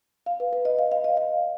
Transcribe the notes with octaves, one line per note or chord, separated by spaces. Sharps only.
F5
B4
B4
D#5
F5
F5
D#5
F5